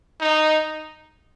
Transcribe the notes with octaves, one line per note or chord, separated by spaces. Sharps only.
D#4